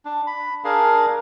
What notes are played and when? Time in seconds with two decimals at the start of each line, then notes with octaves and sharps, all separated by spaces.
0.05 D4
0.27 B5
0.64 D4 G#4 A#4 F5